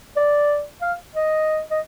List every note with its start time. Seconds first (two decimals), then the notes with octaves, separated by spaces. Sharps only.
0.16 D5
0.81 F5
1.15 D#5
1.70 D#5